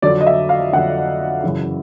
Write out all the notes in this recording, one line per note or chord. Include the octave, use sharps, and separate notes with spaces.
F2 D3 F#3 D5
D#5
E5
F5
F2 D3 F#3 F#5
F#2 C#3 E3